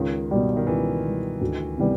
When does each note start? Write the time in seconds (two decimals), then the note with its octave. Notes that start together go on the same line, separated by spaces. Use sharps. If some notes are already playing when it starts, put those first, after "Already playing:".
Already playing: C#2 D#3
0.31 B2 G3
0.57 D#3
0.67 C#2 E3
1.04 B2 G3
1.41 D2
1.78 C3 E3 G3 B3